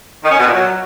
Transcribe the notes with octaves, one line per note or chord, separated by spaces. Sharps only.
D#3
C#4
B2
A#2
F#3